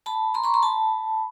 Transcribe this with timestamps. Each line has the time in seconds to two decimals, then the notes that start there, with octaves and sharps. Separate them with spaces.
0.06 A5 B5
0.34 A#5 C6
0.44 B5 C#6
0.54 A#5 C6
0.63 A5 B5